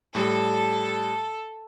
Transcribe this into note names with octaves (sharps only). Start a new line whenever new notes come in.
A2 G3 A4